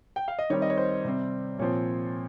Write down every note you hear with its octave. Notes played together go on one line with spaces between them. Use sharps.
G5
F5
D#5
D#3 G3 C4 C#5
D#5
C#5
C5
C3 G3 C4
A#2 F3 C4 C#5